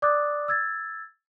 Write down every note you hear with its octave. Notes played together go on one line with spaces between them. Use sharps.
D5 D6 D#6 F#6 A6
E6 G#6 A6